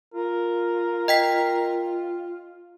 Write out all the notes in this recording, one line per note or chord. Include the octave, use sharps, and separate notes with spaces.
F4 A#4
D#5 G5 B6